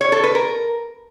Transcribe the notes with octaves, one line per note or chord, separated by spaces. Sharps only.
C#5
A4
B4
A#4